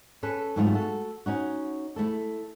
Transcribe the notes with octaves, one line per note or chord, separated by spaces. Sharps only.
C#4 A4 B4
G#2 F#3 A3 C4 E4 F4
F#4 A4
C#4 D#4 F#4
A3 E4 A4